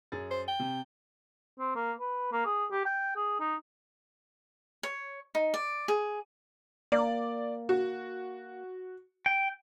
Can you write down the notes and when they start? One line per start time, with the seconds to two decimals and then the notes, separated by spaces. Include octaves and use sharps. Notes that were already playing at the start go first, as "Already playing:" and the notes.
0.12 F#2 G#4 A6
0.31 C5
0.48 G5
0.60 C3
1.59 C4
1.75 A#3
2.00 B4
2.32 A#3
2.46 G#4
2.71 G4
2.85 G5
3.16 G#4
3.40 D#4
4.83 C#5
5.35 D#4
5.54 D5
5.88 G#4
6.92 A#3 D5
7.69 F#4
9.26 G5